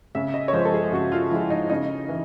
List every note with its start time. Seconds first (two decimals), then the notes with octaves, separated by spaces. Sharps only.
0.15 C#3 E5
0.34 D#5
0.48 C#5
0.53 F3 G#3 C5
0.65 A4
0.74 G#4
0.92 C#3 F#4
1.12 F4
1.31 F3 G#3 E4
1.50 D#4
1.70 C#3 D#4
2.09 E3